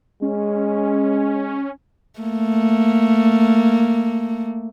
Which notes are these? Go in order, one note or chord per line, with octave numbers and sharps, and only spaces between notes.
G#3 C#4
A3 A#3